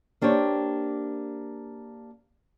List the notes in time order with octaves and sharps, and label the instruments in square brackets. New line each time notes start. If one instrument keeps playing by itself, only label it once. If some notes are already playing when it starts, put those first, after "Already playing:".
[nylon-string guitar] A#3 D4 G4 C5 C#5